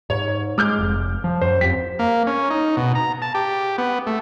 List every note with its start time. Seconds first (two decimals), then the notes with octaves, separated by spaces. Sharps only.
0.10 G#2 C#5
0.58 G#3 D6 F6 G6
0.79 F1
1.24 F3
1.42 F#2 C5
1.61 F2 G4 B6
1.99 A#3
2.27 C#4
2.50 D#4
2.77 B2
2.95 A#5
3.22 A5
3.35 G4
3.78 B3
4.07 A3